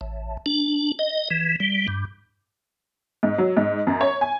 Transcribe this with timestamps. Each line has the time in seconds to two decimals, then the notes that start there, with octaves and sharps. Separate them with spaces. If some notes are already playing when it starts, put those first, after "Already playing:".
0.01 A1
0.46 D4
0.99 D#5
1.30 E3
1.60 G3
1.88 G2
3.23 G#2
3.38 F#3
3.57 G#2
3.87 F#2
4.01 C#5
4.21 G#5